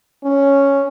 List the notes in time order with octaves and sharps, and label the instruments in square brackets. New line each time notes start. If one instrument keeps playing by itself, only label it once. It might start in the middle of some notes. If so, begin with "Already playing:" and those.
[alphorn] C#4